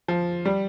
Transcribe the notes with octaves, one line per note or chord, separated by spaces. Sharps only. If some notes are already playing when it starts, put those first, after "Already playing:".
F3
G3